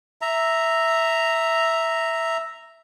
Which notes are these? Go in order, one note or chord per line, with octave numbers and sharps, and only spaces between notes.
E5 A#5